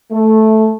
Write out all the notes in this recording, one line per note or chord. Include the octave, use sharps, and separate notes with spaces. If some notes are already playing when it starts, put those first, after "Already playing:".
A3